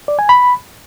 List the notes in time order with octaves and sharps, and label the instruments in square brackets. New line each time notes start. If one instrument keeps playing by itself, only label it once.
[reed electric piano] D5
G#5
B5